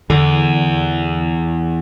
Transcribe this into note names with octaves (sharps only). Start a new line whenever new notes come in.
E2 D3